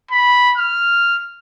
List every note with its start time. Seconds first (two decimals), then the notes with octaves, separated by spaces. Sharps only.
0.11 B5
0.58 F6